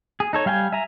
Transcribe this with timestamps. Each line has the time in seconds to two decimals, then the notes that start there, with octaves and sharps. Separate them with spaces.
0.20 G#4
0.33 D#4 A4 C#5
0.46 G3 F5 G5 G#5
0.72 E5 G#5 A#5